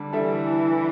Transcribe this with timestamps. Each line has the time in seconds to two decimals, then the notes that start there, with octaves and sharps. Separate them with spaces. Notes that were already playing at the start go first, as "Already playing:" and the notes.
Already playing: D3 G3 D4
0.13 D3 E3 G3 D4 A4 E5